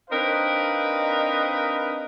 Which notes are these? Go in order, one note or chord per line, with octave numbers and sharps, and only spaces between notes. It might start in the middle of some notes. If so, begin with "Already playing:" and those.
C4 D4 D#4 A#4 B4 F5